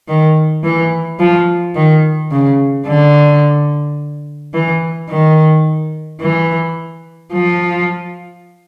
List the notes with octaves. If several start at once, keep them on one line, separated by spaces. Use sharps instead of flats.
D#3
E3
F3
D#3
C#3
D3
E3
D#3
E3
F3